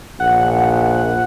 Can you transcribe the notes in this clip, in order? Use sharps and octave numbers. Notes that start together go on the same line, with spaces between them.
A#1 F#5